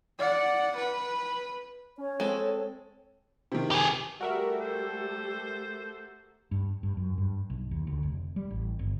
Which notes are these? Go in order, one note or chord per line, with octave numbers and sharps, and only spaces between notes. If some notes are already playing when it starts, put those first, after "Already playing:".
D5 F#5
B4
C#4 C#5
G#3 C4 A4
C3 D#3
G4 G#4
G3 A3 F#4 G4 A4 A#4 E5
C5
G2
G2
F#2
G2
B1
D#2
D2
F1
G3
A1
G1